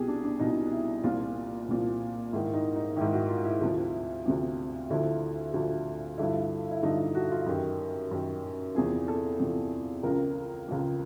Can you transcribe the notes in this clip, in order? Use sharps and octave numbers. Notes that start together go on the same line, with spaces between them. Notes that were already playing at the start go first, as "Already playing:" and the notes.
Already playing: C2 B2 G4 G#4
D4
D4
C2 B2 D#4
E4
C2 A#2 F3 F4
C2 A#2 F3
G#2 D#3 E4
D#4
D#4
G#2 D#3 E4
F#4
F4
E4
D2 C3 F3
D2 C3 F3
D2 D3 F3 E4
D2 D3 F3
G2 D3 F3 E4
E4
G2 D3 F3 D#4
F#4
F4
F#2 D#3 G4
F#2 D#3
E2 C3 F3 G#4
A4
E2 C3 F3
C#2 C#3 F3 A#4
C#2 C#3 F3